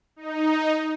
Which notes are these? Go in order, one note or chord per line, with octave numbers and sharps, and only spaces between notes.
D#4